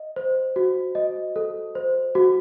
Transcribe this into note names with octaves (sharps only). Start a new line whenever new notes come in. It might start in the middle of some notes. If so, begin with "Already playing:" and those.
Already playing: D#5
C5
F#4
D#5
A4
C5
F#4